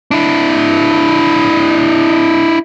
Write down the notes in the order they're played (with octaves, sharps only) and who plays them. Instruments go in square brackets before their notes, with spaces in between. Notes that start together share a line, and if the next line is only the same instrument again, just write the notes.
[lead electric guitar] D4 E4